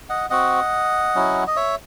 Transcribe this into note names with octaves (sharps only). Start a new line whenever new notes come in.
D#5 F#5
C4 F#4 D#5 F#5
F#3 C#4 E4
D#5
C#5 E5